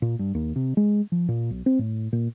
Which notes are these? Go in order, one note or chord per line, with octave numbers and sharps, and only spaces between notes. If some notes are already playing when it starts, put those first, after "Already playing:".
A#2
G2
D#2
C3
G#3
F3
A#2
B1
C4
A2
A#2